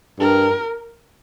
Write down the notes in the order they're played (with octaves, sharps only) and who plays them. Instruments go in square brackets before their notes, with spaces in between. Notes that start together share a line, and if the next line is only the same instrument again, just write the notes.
[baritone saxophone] G2 [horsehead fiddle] A#4